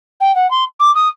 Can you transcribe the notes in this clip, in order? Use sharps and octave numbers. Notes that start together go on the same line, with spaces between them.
G5
F#5
C6
D6
D#6